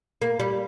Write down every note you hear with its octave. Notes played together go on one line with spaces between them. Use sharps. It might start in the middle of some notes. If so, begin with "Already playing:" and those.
A#3
G3